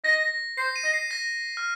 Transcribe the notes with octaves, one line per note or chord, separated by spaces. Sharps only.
D#5 A#6
C5 C7
D#7
D#5
C7
A#6
F6